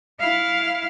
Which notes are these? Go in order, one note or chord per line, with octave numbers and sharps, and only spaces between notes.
E4 F5